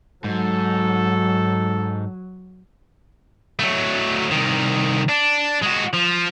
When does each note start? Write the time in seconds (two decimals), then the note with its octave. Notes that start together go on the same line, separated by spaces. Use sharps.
0.24 G#2 F#3 A4
3.59 F#3 A3
4.31 C2 D#3
5.09 D4
5.62 G#3 F#4
5.93 F3